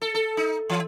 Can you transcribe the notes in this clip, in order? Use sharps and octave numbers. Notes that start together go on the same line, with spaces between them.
A4
A4
D#4
E3